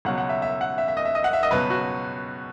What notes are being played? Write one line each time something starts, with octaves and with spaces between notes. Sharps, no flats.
C#2 B2 F#3 F#5
F#5
E5
E5
F#5
E5
E5
D#5
E5
D#5
F#5
E5
D#5
C#2 B2 F#3 B4
F#4